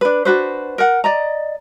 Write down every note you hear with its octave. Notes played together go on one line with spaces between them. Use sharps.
D4 B4
D4 F#4 B4 C5
A#4 F#5
D5 D#5 A#5